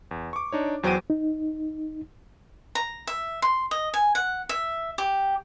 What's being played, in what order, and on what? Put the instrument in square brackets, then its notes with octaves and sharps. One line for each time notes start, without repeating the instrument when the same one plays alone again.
[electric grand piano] E2
C#6 D6
D4 D#4 C#5
E2 F#3 C5 G5 D7 D#7
[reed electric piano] D#4
[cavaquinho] A#5
E5
C6
D#5
G#5
F#5
E5
G4